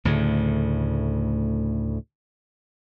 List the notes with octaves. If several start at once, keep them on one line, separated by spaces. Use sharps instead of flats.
D2 A2 C#3